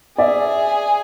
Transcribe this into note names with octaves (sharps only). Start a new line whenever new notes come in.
G#4 D5 E5